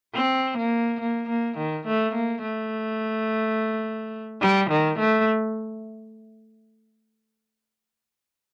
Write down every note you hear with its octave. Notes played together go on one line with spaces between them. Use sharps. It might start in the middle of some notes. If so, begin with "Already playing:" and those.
C4
A#3
A#3
A#3
D#3
A3
A#3
A3
G3
D#3
A3